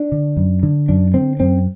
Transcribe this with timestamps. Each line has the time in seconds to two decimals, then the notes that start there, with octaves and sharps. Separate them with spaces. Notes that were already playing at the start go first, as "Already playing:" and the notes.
Already playing: D4
0.12 D3
0.37 F#2
0.63 D3
0.89 F#2 D4
1.14 D3 C4
1.40 F#2 C4